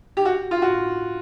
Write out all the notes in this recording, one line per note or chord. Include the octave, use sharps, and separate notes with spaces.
G4
F#4
F4
F#4